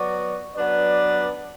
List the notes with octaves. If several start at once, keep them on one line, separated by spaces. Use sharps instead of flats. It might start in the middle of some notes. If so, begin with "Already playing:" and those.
Already playing: F#3 B3 F#4 D5
F#3 B3 D4 B4 D5